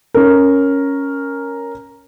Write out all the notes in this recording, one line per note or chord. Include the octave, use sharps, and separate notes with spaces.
C#4 A#4